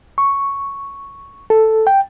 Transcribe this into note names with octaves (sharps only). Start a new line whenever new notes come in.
C#6
A4
G5